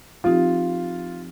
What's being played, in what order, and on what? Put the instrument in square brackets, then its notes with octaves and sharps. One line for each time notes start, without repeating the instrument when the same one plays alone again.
[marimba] F3 C4 D#4 G4 [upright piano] F4